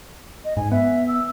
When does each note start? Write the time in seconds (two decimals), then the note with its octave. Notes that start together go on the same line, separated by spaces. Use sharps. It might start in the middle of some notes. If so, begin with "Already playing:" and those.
0.45 D#5
0.57 G#2 G#5
0.72 B3 E5
1.08 E6